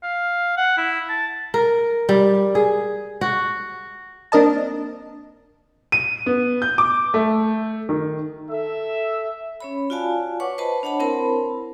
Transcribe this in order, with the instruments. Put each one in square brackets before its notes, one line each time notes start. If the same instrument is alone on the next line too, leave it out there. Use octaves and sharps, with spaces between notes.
[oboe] F5
F#5
E4
A5
[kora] A#4
G3
G#4
F#4
[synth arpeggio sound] A#3 C4 D4 A#4 D#5 A5
[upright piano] D#7
B3
G6
D6
A3
D#3
[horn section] A4 E5
[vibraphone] C#4 C#5 B5
F4 F#4 D5 F5 G#5 A5
B4 C#5 F#5 C#6 D6
B4 C5 D#5 A5 B5
D4 C#5 F#5 A5 B5
C4 E4 A#4 C5 A5 B5